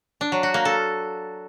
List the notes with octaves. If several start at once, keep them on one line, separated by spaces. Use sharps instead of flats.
D4
F#3
F#4
A#3
A4